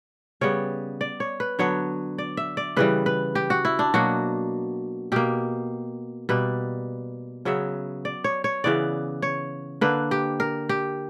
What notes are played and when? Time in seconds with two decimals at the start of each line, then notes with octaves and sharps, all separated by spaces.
0.41 C#3 G3 B3 C#5
1.01 D5
1.20 C#5
1.40 B4
1.59 D3 F#3 B3 C#5
2.18 D5
2.37 E5
2.57 D5
2.76 C#3 E3 G3 B4
3.06 B4
3.35 G4
3.50 F#4
3.65 E4
3.79 D4
3.94 B2 F#3 A#3 F#4
5.12 B2 A#3 G4
6.29 B2 G3 A#3 B4
7.45 C#3 F#3 B3 E5
8.05 D5
8.24 C#5
8.44 C#5
8.64 C#3 E3 B3 D5
9.22 C#5
9.81 D3 A#3 B4
10.11 G4
10.40 A#4
10.69 G4